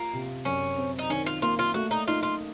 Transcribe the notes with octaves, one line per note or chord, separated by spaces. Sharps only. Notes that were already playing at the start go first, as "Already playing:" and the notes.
Already playing: A#3 F4
C3
F#2 C#4
C4
D#4
D#3 C#4
F4
A#3 F4
F4
A3 F#4
D#4
D#4 F4
F4